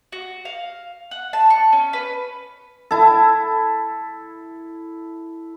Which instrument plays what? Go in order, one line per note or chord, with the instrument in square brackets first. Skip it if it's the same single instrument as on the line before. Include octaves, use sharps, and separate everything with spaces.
[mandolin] F#4
F5
F#5
A5
C#6
C#4
B4
[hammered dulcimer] E4 A4